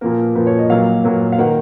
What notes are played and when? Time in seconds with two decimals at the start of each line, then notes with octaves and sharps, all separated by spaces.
0.01 A#2 F3 A#3 A#4
0.35 A#2 F3 A#3 B4
0.47 C#5
0.59 D#5
0.70 A#2 F#3 A#3 F5
1.04 A#2 F#3 A#3
1.32 F5
1.38 D#3 A#3 F#5